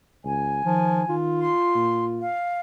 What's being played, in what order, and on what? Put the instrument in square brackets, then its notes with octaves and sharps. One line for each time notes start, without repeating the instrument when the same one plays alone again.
[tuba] C#2 [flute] G#5
[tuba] D#3 [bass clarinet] F3
[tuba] D#3 [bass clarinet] F4
[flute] C6
[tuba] A#2
[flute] F5